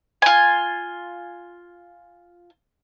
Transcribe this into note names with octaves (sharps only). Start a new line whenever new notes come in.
F4 G#5